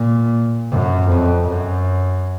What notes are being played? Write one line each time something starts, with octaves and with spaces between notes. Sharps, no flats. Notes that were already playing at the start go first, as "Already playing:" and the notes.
Already playing: A#2
F#2
F2
F#2